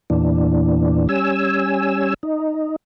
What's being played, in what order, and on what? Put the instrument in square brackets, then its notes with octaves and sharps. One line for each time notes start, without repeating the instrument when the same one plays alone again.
[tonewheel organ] E2 A#2 E3 D4
G3 C#4 G#5 E6
D#4